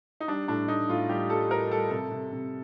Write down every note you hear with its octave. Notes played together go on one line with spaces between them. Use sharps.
D#4
G3 D4
A2 D4
A2 D#4
A2 F4
G3 G4
G3 A4
A2 A#4
G3 A4
C3 A4
C3
C3